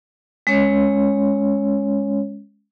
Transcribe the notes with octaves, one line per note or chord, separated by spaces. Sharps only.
G#3 C#4 C#5